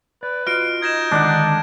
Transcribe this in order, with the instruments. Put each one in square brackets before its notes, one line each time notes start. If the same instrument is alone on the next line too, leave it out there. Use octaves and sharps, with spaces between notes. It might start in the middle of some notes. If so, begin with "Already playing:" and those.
[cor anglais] B4 [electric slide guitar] D5
[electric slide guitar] F4 F#4 D#5 [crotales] F6 D7
[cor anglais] D#4 [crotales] G#6 A#6 E7
[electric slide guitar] D3 D#3 G#3 [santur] D4 D5 F#5